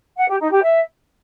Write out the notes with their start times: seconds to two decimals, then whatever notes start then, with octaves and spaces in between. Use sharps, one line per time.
0.17 F#5
0.28 G4
0.39 D#4
0.50 G4
0.62 E5